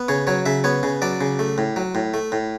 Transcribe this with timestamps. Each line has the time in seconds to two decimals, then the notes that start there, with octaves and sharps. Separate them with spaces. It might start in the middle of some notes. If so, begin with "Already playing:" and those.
Already playing: B3
0.08 C#3 C#5
0.27 F#3 C#5
0.46 C#3 E5
0.64 B3 C#5
0.83 C#3
1.02 F#3 D5
1.21 C#3
1.39 A3
1.58 A2
1.76 F#3
1.95 A2
2.14 A3
2.32 A2